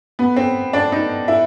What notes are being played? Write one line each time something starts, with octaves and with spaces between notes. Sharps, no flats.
B3
C4
D4
D#4
E4